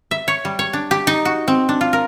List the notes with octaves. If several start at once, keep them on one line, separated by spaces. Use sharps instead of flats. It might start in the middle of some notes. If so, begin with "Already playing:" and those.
E5
C#5
G3
C#5
D4
G4
D#4
F#4
C4
D4
F4
A#4